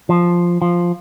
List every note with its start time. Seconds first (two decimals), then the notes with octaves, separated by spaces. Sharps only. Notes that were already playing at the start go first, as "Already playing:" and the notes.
0.09 F3
0.62 F3